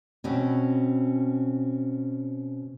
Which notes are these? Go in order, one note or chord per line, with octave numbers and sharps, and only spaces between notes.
B2 C4 C#4